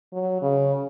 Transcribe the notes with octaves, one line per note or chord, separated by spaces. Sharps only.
F#3
C#3